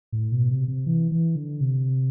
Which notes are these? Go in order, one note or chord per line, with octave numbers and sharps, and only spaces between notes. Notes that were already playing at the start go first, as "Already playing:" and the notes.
A2
B2
C3
C3
E3
E3
D3
C3